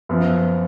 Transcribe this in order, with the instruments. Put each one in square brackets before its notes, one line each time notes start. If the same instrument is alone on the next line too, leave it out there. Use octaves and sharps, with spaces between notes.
[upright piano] F#2 F3 B3